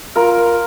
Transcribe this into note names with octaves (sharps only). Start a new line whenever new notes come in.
F4 A#4